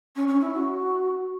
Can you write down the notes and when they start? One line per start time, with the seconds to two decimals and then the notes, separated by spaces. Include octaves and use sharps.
0.16 C#4
0.28 C#4
0.41 E4
0.54 F#4